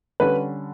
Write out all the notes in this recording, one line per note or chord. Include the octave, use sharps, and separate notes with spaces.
D3 G3 C#4 B4